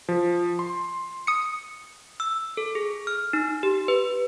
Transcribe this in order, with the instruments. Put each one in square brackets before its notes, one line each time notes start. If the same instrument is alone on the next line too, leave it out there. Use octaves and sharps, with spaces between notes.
[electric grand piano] F3
C6
[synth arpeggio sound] D#6 C#7
[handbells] E6
A4
G#4
F6
D#4
G4
B4